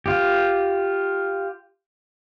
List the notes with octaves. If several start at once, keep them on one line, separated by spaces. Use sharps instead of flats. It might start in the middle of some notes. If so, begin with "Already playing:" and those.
F4 G4